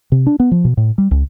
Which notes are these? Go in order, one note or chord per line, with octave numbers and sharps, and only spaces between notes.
C3
D4
B3
F3
B2
A2
G3
C#2